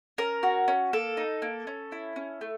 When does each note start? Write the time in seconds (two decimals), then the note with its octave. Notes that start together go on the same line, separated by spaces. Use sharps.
0.18 C#4 A#4
0.43 F#4
0.68 C#4
0.93 A#3 A4
1.17 D#4
1.42 A#3
1.67 C#4
1.92 E4
2.16 C#4
2.41 A3